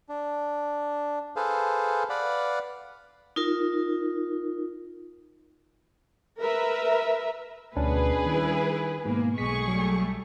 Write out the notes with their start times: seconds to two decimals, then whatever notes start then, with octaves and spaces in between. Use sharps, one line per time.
0.09 D4
1.36 G#4 A4 B4 C5 F5
2.10 B4 D5 F5 F#5 B5
3.36 D#4 F4 A#4
6.41 A#4 B4 E5
7.77 D2 B2 C#4 D4 G#4 B4
8.26 D#3 G3 E4
9.05 G#2 B2 A#3
9.38 B1 G#3 A3 G#4 C#6 B6
9.68 F#3 G3 A3